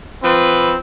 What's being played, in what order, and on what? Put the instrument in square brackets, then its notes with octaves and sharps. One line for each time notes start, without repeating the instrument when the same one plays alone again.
[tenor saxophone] F3 [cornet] C4 [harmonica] B4